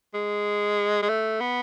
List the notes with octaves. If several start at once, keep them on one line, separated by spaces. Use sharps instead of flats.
G#3
G#3
A3
B3